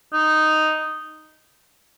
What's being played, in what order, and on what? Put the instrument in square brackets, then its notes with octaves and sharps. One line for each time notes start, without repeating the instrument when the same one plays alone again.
[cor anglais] D#4